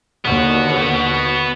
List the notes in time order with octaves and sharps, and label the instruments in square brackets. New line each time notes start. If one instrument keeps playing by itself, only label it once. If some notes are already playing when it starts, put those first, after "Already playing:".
[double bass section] D#2 D3 [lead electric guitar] B3 F#4